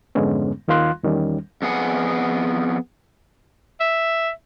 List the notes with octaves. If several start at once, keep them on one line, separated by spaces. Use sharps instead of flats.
F2 G#2 D3 G#3 B3 C#4
D#2 D#3 F4 F5 C6 F#6
E2 D#3 G3 C#4
F2 B3 G#4 F#5
E5